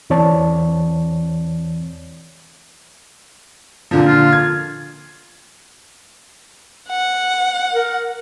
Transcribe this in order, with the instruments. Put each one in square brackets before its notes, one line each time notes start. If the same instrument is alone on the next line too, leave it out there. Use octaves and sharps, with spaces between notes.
[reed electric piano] E2 E3 C4 C#5 D5 A5
[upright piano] A#2 D3 F3
[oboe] F4
[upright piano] G#6
[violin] F#5
[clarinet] A#4